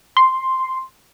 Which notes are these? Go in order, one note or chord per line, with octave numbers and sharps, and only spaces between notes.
C6